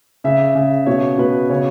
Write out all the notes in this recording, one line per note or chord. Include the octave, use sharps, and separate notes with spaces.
C#3 E5
C#3
B2 C#5
B2 B4
C#3 C#5